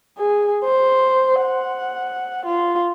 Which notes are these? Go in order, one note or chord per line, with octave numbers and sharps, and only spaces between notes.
G#4
C5
F#5
F4